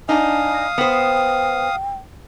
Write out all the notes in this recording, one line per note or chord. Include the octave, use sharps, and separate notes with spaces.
D4 D#4 F5 G#5 D#6
B3 C5 G5